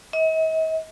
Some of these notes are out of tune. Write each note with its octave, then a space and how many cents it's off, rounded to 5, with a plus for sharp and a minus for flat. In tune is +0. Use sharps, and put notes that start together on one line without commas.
D#5 +45